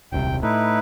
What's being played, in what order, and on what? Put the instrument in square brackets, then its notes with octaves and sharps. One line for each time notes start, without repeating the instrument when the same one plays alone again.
[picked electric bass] D#1 C2 C3 [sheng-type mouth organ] G5
[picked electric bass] A2 [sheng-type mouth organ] D#4 E4 B4